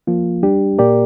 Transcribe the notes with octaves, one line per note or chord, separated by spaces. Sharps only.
F3 A#3 F4
G3 D4 G4
A#2 A#3 G4 A#4 D5